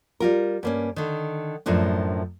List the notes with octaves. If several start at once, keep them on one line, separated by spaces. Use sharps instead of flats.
G3 F4 A#4
G2 A#3 C#4
D3 D#3
F#2 A2 F3 D4